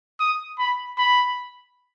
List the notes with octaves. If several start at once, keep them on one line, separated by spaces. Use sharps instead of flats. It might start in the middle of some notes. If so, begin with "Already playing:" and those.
D#6
B5
B5